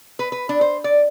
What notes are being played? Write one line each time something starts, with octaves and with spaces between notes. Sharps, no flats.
B4
B4
D4
C5
D5